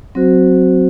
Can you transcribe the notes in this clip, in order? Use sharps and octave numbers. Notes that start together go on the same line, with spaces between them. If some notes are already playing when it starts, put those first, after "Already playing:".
F#3 C4 F#4 C5